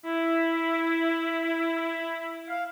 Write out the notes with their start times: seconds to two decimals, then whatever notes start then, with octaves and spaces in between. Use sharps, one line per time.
0.05 E4
2.49 F5